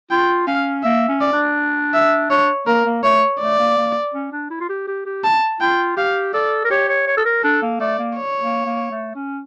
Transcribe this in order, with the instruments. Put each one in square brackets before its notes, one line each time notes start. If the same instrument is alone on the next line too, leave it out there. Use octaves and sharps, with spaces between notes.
[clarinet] F4 [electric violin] G5
[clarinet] C#4 [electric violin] F5
[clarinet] A#3 [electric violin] E5
[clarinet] C#4
[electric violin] D5
[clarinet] D4
[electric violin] E5
[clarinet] D4 [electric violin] C#5
[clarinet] A#3 [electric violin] A#4
[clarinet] A#3
[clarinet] A3 [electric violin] C#5
[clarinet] A3 [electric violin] D5
[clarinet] A#3
A#3
C#4
D4
E4
F4
G4
G4
G4
[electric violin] A5
[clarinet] F4 [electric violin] G5
[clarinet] G4 [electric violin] F5
[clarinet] A4 [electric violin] D5
[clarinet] A#4
[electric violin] G4 [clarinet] C#5
[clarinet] C#5
C#5
A4
A#4
[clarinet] D4 [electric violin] A4
[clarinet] A#3
[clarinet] A3 [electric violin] D5
[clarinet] A#3
[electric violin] C#5
[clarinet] A#3
A#3
A3
C#4